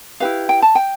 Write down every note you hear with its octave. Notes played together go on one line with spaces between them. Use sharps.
E4 G4 B4 F5
G5
A5
G5